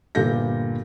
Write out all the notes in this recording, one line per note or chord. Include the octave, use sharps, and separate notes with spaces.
G1 A#2 G3 A4 G6 A#6